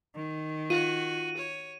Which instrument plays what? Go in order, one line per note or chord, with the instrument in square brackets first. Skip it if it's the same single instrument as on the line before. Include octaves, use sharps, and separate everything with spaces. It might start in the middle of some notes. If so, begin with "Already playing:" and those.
[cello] D#3
[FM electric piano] F4 [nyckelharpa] F#4 [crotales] D#7
[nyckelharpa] C#5